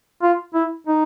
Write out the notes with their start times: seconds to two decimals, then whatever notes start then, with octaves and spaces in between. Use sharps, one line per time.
0.23 F4
0.54 E4
0.87 D#4